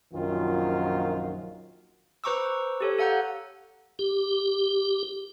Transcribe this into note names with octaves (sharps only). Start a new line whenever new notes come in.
A#1 F#2 D#3 F4
B4 C5 A#5 C#6 D6 E6
G4 A4 C#5
A4 F5 F#5 A#5 G6
G4